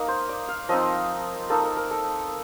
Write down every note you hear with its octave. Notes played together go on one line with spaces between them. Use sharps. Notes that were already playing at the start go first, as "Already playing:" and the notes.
Already playing: A#3 D#4 D#5
C5
D5
F5
F3 C4 D#4 D#5
A#3 D#4 A4
A#4
A#4
A4